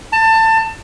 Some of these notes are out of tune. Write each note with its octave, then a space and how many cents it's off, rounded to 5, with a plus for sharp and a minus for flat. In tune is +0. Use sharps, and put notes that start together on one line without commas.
A5 +25